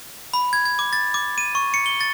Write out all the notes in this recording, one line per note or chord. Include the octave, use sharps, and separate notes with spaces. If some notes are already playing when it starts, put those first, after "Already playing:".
B5
G#6
G#6
D6
A6
D6
D#7
C#6
C#7
G7
A6